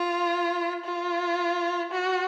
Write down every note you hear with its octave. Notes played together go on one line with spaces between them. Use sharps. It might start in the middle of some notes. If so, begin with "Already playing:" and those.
Already playing: F4
F4
F#4